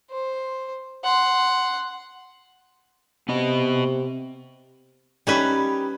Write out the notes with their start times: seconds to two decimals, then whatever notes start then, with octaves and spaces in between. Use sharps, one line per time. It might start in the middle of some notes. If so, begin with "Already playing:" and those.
0.11 C5
1.04 F#5 C6
3.29 C3 B3 D#5
5.27 G3 C#4 D#4 G4 A#4 B4